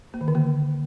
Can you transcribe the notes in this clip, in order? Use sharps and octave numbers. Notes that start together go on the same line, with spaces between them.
A#3
D#3
D3
A#3